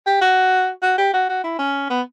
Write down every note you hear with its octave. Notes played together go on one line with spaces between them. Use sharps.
G4
F#4
F#4
G4
F#4
F#4
E4
C#4
B3